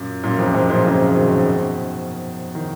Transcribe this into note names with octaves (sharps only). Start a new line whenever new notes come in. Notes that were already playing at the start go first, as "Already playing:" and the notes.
Already playing: F#2 A#2
F#2 A#2
F2 G#2
F2 G#2
F#2 A#2
A#2 C#3
B2 D#3
D#3